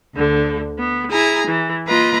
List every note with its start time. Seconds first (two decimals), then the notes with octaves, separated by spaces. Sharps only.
0.13 D2 D3
0.78 B3
1.11 E4 G#4 G#5 A#5
1.47 E3
1.87 A#3 F4 B4 D#5 A#5